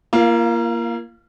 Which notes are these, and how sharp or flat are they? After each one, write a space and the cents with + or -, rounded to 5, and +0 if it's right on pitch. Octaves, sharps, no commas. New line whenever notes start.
A#3 +10 F4 -40 F5 +0